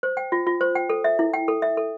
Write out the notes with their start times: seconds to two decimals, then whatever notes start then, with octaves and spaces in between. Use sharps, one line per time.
0.03 C5
0.17 G5
0.32 F4
0.47 F4
0.61 C5
0.75 G5
0.90 A4
1.04 E5
1.19 E4
1.34 G5
1.48 A4
1.62 E5
1.77 A4